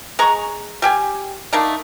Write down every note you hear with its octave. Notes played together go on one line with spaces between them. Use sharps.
G#3 A#5 C#6
G3 G4 G#5
A3 A#3 D4 D#4